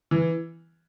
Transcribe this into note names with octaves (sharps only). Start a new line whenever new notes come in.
E3